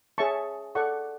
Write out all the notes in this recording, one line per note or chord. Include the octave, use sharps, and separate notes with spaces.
G#4 C#5 E5 A5 C#6
A4 D5 F#5 C#6